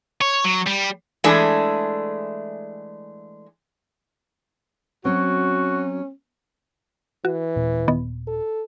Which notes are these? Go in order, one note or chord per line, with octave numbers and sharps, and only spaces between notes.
C#5
F#3
G3
E3 G#3 A3 D4 G#4
F#3 C4 C#4 F#4
E3 F#4
D#1 A#2 C4
D#3 B3
A4